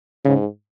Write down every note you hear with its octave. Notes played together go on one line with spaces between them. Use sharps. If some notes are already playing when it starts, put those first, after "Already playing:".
G#2 C#3